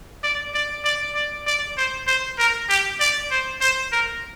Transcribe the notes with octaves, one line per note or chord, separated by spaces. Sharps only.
D5
D5
D5
D5
D5
C5
C5
A#4
G4
D5
C5
C5
A#4